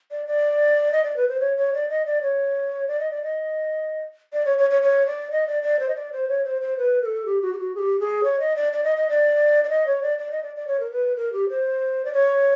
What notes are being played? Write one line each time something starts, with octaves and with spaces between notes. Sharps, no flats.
D5
D5
D#5
D5
B4
C5
C#5
C#5
D5
D#5
D5
C#5
D5
D#5
D5
D#5
D5
C#5
C#5
C#5
C#5
D5
D#5
D5
D5
C5
D#5
D5
C5
C#5
C5
C5
B4
A#4
A4
G4
F#4
G4
F#4
G#4
G4
G#4
C#5
D#5
D5
D5
D#5
D#5
D5
D5
D#5
C#5
D5
D5
D#5
D5
D5
C#5
A#4
B4
A#4
G4
C5
D5
C#5